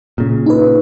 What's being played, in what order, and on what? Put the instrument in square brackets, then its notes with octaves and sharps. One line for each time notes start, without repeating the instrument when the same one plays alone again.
[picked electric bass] A#2 C#3
[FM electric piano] D#4 B4